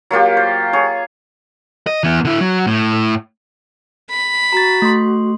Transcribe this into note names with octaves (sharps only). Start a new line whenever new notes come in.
F#3 A#3 F4 G4
C5
G#4 C#5
D#5
E3 B3
D3 E4
F#3
A2
B5
F#4 A#5 A6
A3 C6